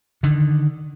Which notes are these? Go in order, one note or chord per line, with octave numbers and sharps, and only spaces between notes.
D3 D#3